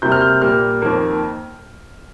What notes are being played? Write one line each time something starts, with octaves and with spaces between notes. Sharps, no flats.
C3 G3 A#3 G6
F6
G6
A#2 G3 A#3 F6
F2 D#3 A#3